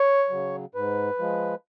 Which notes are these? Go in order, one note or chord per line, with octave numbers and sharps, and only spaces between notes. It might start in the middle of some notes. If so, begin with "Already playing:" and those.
Already playing: C#5
C#3 F#3
G#2 B4
F3 G#3